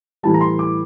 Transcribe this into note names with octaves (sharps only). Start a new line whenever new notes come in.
A2 E3 G3 A5
A#5
C6
D6